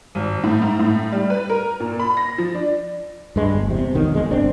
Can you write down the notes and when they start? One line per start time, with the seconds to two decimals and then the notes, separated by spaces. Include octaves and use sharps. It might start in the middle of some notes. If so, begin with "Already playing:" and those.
0.15 G#1
0.44 A2
0.62 G#2
0.79 A2
1.12 G3
1.30 B4
1.49 A#4
1.80 A#2
1.99 B5
2.17 A#6
2.38 F3
2.54 D4
3.36 G2 G#3
3.53 G1
3.68 E2 C3
3.94 B1 F2 D#3 F#3
4.11 F1 B1 G#3
4.31 G1 C4 D4